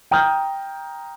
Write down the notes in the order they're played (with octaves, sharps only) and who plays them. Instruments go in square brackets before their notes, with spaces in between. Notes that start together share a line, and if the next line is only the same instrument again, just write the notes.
[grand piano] G5 A#5 D#6 F6 G6